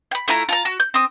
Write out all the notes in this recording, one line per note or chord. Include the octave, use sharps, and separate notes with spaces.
G5 B5
A3 E4 F4 A#5
F4 A5 A#5
F#4
G6
C4 D#6